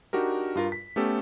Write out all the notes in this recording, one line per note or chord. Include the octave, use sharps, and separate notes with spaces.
D4 D#4 F#4 G4 A#4
G2 F4 A#4
B6
A3 B3 C#4 G4 A4